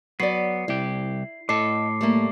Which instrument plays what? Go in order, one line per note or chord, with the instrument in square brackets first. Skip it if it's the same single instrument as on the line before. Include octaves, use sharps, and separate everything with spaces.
[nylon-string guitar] F#3 D5 [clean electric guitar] B3 [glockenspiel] C7
[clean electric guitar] C2 G4 [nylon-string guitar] E4
[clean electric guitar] A2 A4 [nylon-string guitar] D#5 [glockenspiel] D6 C7
[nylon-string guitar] G3 A3 A#3